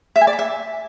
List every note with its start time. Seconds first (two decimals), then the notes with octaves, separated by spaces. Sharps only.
0.16 E5
0.21 G#5
0.27 D5
0.33 B5
0.39 E5